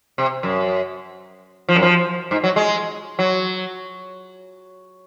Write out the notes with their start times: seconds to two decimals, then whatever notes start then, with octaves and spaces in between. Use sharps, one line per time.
0.18 C3
0.43 F#2
1.69 F3
1.76 F#2
1.82 F3
2.31 G#2
2.44 F#3
2.56 G#3
3.19 F#3